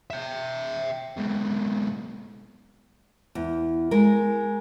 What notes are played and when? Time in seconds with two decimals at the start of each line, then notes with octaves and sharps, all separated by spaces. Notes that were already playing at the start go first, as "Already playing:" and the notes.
0.10 E5 G5
1.17 G#2 B2
3.35 E2
3.91 G#3 A#4